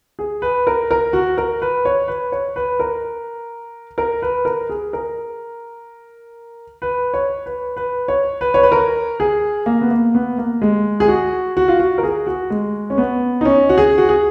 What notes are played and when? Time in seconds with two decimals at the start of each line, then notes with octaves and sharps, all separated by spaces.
0.19 G#4
0.42 B4
0.67 A#4
0.91 A#4
1.13 F#4
1.38 A#4
1.62 B4
1.85 C#5
2.08 B4
2.32 C#5
2.56 B4
2.79 A#4
3.98 A#4
4.22 B4
4.45 A#4
4.69 G#4
4.93 A#4
6.82 B4
7.14 C#5
7.46 B4
7.77 B4
8.08 C#5
8.41 B4
8.54 C#5
8.63 B4
8.72 A#4
9.20 G#4
9.66 A#3
9.81 B3
9.91 A#3
10.15 B3
10.38 A#3
10.62 G#3
11.00 G#4
11.08 F#4
11.57 F#4
11.68 F4
11.79 F#4
11.98 A#4
12.03 G#4
12.27 F#4
12.50 G#3
12.90 C#4
12.98 B3
13.41 D#4
13.45 C#4
13.69 F#4
13.78 G#4
13.98 F#4
14.09 G#4